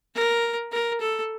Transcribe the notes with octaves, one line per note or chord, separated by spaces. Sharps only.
A#4
A#4
A4